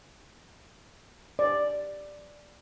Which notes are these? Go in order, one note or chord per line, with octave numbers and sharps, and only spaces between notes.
D5